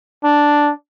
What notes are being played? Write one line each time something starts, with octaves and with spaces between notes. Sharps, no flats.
D4